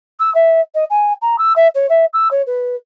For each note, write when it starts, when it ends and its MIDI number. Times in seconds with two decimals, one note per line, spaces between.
0.19 0.33 88
0.34 0.60 76
0.74 0.84 75
0.90 1.13 80
1.22 1.36 82
1.38 1.53 88
1.56 1.67 76
1.74 1.86 73
1.89 2.05 76
2.13 2.28 88
2.31 2.42 73
2.46 2.76 71